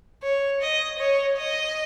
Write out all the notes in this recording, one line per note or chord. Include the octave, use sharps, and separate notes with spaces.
C#5
D#5
C#5
D#5